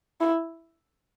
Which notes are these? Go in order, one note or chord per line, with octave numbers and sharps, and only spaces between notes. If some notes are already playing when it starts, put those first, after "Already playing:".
E4